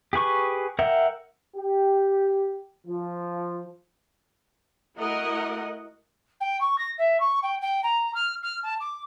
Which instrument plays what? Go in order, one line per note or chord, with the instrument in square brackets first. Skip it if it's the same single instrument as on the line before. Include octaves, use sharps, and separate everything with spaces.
[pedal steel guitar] G4 G#4 B4 C#6
A#4 E5 F#5 G5
[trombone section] G4
F3
[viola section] A3 E4 F#4 A#4 D#5 F#5
[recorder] G5
C#6
A#6
E5
C#6
G5
G5
A#5
F6
F6
A5
D6